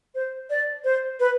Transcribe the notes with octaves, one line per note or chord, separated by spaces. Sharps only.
C5
D5
C5
B4